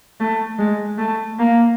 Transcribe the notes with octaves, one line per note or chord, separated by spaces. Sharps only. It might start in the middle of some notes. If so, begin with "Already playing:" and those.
A3
G#3
A3
A#3